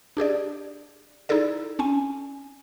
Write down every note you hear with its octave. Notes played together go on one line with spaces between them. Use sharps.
D4 G4 G#4 D5
D#4 E4 G#4 A4 D5
C4 C#4 G#5